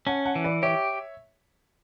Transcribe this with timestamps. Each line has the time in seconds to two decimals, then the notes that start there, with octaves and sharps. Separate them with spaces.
0.07 C#4 F#5 A5
0.25 F#5 A5
0.36 E3
0.44 B4 D5
0.63 G4 C#5 E5